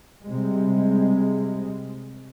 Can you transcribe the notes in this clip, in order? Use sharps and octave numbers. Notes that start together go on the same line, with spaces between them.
C3 G3 G#3